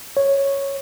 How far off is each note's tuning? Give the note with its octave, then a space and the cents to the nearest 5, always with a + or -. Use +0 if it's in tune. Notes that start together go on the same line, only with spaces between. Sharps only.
C#5 -5